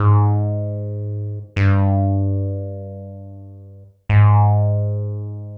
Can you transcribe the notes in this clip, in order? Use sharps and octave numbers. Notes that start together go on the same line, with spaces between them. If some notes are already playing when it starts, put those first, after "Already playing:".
Already playing: G#2
G2
G#2